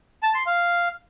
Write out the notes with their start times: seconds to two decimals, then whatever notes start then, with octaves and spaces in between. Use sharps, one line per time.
0.23 A5
0.35 C6
0.46 F5